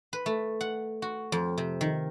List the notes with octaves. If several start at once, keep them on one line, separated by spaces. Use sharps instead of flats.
B4
A3
F#5
F#4
F2
C3
D#3